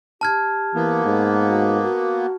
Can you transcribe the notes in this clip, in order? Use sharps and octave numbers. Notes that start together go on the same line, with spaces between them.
G4 A5 F6 G#6
E3 A#3 B3
G#2
F#4
F#4